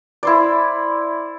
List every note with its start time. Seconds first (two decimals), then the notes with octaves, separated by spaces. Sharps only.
0.23 E4 C5 D5